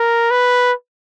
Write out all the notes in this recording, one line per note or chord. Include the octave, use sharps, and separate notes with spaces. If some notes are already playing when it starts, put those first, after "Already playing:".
Already playing: A#4
B4